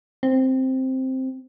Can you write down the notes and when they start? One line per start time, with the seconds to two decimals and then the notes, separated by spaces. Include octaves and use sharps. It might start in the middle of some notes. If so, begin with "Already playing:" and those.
0.23 C4